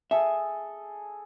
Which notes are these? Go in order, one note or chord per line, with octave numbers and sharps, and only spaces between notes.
G#4 A4 E5